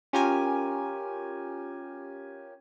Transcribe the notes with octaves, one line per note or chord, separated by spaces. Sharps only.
C#4 F4 G4 A#4 G#5